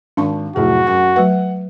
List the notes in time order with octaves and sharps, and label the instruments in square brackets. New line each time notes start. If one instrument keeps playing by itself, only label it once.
[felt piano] G#1 [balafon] D4 A5 C#6
[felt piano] F1 A2 F#3 [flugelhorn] F#4 [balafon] G#4
[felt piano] F#2 [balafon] F#5
[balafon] F#3 A3 B4 [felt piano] F#5